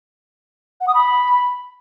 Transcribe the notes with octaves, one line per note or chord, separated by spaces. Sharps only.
F#5
D#6
B5